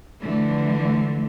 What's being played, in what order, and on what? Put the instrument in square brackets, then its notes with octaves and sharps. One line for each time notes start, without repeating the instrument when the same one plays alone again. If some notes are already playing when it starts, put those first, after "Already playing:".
[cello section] D3 E3 F3 A3